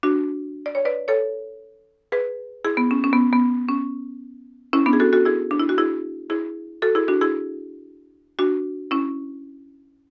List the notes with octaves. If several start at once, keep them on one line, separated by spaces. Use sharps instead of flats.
D4 F#4
D5
C#5
B4 D5
A4 C#5
G#4 B4
E4 G#4
B3
C#4
C#4
B3
B3
C#4
C#4 E4
B3 D4
G#4
F#4 A4
F#4 A4
E4 G#4
D4
E4
F#4
E4 G#4
E4 G#4
F#4 A4
E4 G#4
D4 F#4
E4 G#4
D4 F#4
C#4 E4